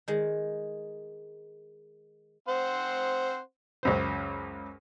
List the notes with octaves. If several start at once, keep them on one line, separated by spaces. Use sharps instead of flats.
D#3 G#3
C4 C5 F#5
C#2 F#2 C5